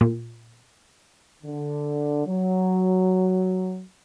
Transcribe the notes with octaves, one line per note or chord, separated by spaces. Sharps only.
A#2
D3
F#3